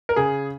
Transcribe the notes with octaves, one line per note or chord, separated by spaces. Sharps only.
A#4
C#3 G#4